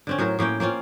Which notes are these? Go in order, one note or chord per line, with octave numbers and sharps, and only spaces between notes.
D3 C4 C#4
A2 F#3 A#4 C5
A2 A#3 C#4 G5
A#3 C4 C#4 F4